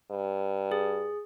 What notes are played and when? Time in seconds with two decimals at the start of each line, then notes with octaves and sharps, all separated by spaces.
0.11 G2
0.72 G#4